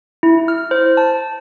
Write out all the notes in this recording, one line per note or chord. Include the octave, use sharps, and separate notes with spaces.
E4
F6
C5
A5